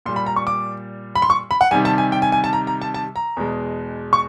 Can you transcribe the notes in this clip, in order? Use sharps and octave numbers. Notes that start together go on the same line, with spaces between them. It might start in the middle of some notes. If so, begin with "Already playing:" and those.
A#2 G3 C6
B5
A#5
C#6
D6
B5
C6
C#6
B5
F#5
C3 D#3 G3 G#5
A5
G#5
G5
G#5
G#5
A5
A#5
A#5
A5
A5
A#5
E2 B2 G#3
C#6